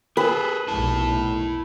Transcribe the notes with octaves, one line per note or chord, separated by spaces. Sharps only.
G#4 A4 B4
F1 B1 E4 A5